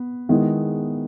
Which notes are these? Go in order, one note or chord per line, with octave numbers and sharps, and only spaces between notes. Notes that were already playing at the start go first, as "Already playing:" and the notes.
Already playing: B3
D#3 G#3 B3 E4